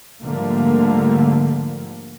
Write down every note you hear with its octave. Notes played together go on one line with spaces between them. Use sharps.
G#2 D3 F3 G3 A3 A#3